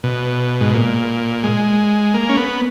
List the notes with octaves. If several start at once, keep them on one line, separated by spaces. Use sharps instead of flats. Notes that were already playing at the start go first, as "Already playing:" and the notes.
B2
G#2
A#2
G#3
A#3
C#4
B3